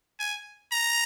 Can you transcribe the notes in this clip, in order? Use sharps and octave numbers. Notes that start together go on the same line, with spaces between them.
G#5
A#5